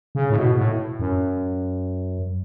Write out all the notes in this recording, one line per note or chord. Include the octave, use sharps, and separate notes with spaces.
C#3
A2
B2
A2
F#2